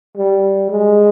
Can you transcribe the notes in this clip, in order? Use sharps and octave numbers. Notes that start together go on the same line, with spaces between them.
G3
G#3